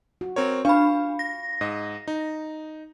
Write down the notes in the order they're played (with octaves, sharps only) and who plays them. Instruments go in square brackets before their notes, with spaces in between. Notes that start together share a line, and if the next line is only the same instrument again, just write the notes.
[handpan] F#4
[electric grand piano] C4 A#4 C#5
[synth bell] D4 B5 [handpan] F5 [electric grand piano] C#6
[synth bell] A#6
[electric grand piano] G#2 D#5
D#4